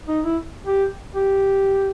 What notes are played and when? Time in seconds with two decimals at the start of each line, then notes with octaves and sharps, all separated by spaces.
0.08 D#4
0.25 E4
0.66 G4
1.15 G4